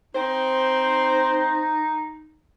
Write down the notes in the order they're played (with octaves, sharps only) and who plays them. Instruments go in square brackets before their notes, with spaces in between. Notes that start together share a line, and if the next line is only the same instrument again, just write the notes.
[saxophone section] C4 C5 [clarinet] D#4